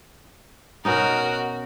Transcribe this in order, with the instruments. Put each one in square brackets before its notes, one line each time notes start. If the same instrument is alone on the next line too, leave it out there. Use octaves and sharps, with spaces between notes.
[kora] B2 C#4 D#4 [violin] F#4 A#4